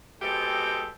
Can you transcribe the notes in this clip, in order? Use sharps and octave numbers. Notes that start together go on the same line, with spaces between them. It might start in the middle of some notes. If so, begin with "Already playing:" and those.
B2 G#3 C4 G4 A4 D#5